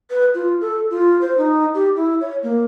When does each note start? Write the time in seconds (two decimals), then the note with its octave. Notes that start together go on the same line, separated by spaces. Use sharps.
0.11 B4
0.34 F4
0.61 A4
0.90 F4
1.21 C5
1.38 D#4
1.74 G4
1.96 E4
2.21 C#5
2.43 A#3